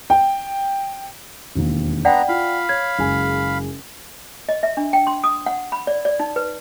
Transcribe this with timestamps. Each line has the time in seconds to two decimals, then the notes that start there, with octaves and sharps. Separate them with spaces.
0.10 G5
1.55 E1 D#2
2.05 B3 D4 D5 F#5 G5 A#5
2.28 F4 F5 B5
2.69 C#5 G#6
2.99 F#1 G#3 G#5
4.49 D#5
4.63 E5
4.77 D4
4.93 G5
5.07 C6
5.24 D#6
5.46 F#5
5.72 B5
5.87 D5
6.05 D5
6.20 D#4
6.36 B4